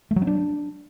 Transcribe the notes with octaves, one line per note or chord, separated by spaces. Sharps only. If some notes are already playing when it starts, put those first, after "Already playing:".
A3
F#3
C#4
D4